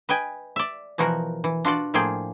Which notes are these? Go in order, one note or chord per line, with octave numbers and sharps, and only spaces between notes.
B4 D#5 G5 G#5
D5 E5
B2 E3 F3 F#4 A#4
E3
D4 F4 F#4 D5
A2 F3 A#3 F4 G#4 G5